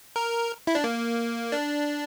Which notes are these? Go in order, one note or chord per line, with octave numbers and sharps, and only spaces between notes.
A#4
E4
D4
A#3
D4